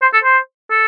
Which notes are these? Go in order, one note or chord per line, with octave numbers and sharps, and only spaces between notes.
C5
A4
C5
A4